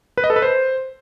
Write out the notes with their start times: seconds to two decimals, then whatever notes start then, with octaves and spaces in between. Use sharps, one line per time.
0.18 B4
0.24 D#5
0.30 A4
0.36 B4
0.42 C5